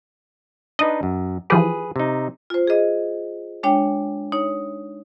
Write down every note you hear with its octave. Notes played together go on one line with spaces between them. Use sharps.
D4 D#4 B4 D#5
F#2
E3 F3 G4 G#4 B4
C3 D#4
F4 C5
G#4 D#5
G#3 D4 C#5 G5
D#4 C#5